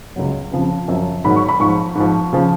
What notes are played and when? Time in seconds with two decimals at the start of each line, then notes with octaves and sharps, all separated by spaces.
0.16 C#2 C#3 F#3
0.52 F2 C#3 F3
0.88 F#2 F3
1.24 G#2 D#3 F#3 B5
1.36 C#6
1.49 B5
1.60 G#2 F3 C#6
1.95 G#2 F3
2.33 C#3 F3